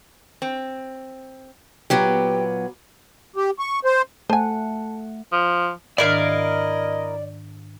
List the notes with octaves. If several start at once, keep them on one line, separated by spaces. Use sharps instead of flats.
C4
A#2 F#3 B3 G4
G4
C#6
C5
A3 C5 F#5 G#5 A5
F3
G#2 D#3 D4 E4 A#4 D5 D#5 F5